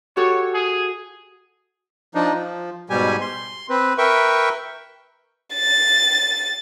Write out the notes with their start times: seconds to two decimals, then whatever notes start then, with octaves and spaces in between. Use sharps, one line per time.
0.17 F#4 G4 A4 C#5
0.54 G#4
2.15 F3 D4 D#4
2.33 F3
2.90 G#2 B2 G3 G4 G#5
3.21 C6
3.70 C4 B4
3.98 A#4 B4 E5 G5 C#6
5.55 A6